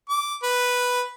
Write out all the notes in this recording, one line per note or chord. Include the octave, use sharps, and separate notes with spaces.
D6
B4